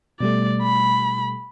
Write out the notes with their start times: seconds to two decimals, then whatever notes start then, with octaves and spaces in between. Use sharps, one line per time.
0.21 B2 G3 A3 D5
0.63 B5